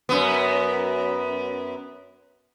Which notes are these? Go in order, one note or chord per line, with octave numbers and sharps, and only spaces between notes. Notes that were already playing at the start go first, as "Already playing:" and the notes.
F#2 B3